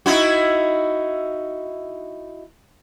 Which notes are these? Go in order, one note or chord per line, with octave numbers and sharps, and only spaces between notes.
D#4 E4 F#4